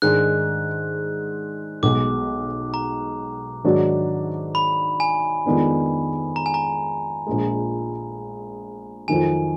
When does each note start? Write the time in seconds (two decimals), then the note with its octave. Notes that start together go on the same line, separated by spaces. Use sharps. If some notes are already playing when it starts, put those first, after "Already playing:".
0.02 G#2 D#3 G#3 D4 F#6
1.82 B1 B2 G#3 D6
2.74 A#5
3.64 G#2 D#3 F#3 D4 F#4
4.55 B5
5.00 G#5
5.46 F2 D#3 G#3 B3 D4
6.36 A#5
6.46 G#5
6.54 A#5
7.27 A#1 A#2 G#3
9.08 F2 D#3 F#3 G#5